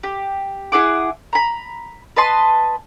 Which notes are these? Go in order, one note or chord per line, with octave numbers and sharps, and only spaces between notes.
G4
E4 G#4 F#5 D6
A#5 B5
B4 D#5 A5 C6